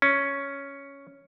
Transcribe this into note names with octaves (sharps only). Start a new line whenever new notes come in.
C#4